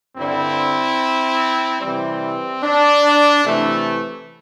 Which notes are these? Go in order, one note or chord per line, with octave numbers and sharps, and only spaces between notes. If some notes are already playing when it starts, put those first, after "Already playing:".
G2 D3 G3 C4 E4
C3 E3 G3 C4
D4
C3 E3 A3